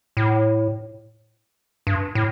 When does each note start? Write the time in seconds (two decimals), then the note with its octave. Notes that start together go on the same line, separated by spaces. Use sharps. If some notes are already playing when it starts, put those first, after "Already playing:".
0.17 A2
1.87 G2
2.15 A2